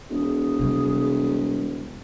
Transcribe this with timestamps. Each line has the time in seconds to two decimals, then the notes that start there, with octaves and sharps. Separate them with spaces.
0.10 E1 G#4
0.59 C3 G3